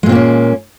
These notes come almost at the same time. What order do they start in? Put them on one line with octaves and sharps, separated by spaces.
G#3 A#2 C4 A#3 C#4